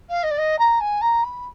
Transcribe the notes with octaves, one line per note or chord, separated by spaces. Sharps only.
F5
D#5
D5
D#5
A#5
G#5
A#5
B5